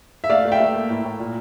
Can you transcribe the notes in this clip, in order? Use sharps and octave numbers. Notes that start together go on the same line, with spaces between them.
E5
A3 D5 F5
A3 F5
E5 G5
A3
A#3
A2
A2
A#2